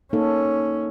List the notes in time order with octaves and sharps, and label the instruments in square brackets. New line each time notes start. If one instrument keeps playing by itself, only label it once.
[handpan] A#3 D#4 A4 [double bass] C#4